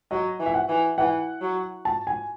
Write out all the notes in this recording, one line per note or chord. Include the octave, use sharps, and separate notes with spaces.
F#3 D#5
E3
E5
F#5
E3
E3 F#5
F#3
A5
G#5